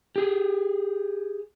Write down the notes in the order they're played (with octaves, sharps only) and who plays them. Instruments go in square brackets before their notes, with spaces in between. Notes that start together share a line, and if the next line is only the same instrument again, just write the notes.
[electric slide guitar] G4 G#4